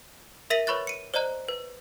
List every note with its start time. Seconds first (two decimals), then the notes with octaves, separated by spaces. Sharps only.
0.50 A#4 E5 A#6 B6 D#7 F#7
0.67 B4 C#5 B5 C#6 F#6 A6
0.87 C#7 D#7
1.14 C5 D5 D#5 A#5 F#6
1.49 B4